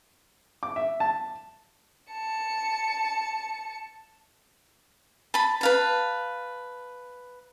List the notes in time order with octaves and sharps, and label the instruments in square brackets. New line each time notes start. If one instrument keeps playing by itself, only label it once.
[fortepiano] D6
E5
A5
[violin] A5 C#7
[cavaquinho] A5 B5
B4 F5 A5